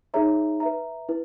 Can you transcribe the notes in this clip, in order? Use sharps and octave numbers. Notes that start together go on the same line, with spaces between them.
D#4 G#4 C#5 E5 A#5
B4 E5 A#5
E4 B4